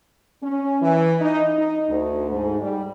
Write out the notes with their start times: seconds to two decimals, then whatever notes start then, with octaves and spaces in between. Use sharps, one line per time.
0.43 C#4
0.82 E3
1.21 D#4
1.57 D#4
1.89 D2
2.31 G#2
2.61 G3